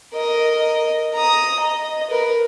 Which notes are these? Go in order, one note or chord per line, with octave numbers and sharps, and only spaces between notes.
A#4 D#5
A#5 D#6
D#5
A#4 B4